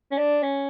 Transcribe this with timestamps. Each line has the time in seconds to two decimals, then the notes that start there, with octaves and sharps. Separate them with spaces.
0.11 C#4
0.18 D4
0.43 C#4